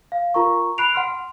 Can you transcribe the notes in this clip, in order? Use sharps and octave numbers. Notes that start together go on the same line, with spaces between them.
F5
F4 A#4 A#5 C#6
B5 F#6 C7 D7 F7
F#5 C6 F6